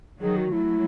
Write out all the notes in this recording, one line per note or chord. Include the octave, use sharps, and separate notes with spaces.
D#3 F#3 G#4
F#4
F#3 A3 E4